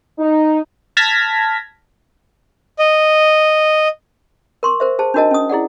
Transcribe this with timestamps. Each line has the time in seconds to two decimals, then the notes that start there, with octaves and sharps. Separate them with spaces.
0.19 D#4
0.97 A5 F6 G#6 A#6 B6
2.79 D#5
4.63 A#4 C6 C#6
4.80 A#4 C5 E5
4.99 G#4 C5 A5
5.14 D4 D#4 F#4 A#4 D#5 A5
5.31 C#4 D#6
5.49 E4 G#4 D5 F#5